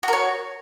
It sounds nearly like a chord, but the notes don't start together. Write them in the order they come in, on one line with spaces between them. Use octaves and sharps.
F#4 A#4 C#5